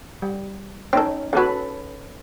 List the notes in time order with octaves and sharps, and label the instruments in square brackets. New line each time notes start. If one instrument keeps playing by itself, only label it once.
[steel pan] G3
[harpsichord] C4 A4 [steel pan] C#4 D#4
[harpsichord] E2 F#4 [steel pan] C#4 A4 B4